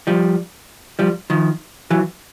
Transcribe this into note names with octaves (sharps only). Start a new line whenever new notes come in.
F3 G3
F3 G3
D#3 F3
E3 F#3